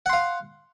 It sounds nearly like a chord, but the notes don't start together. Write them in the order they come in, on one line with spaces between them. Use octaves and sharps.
F#5 C6 F5